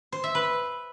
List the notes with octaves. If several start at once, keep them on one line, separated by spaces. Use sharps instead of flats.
C5
E5
B4